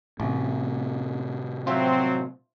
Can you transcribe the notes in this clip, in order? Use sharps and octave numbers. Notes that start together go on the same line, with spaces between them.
A1 A2 C3
F#3 C4 F4 C5 E5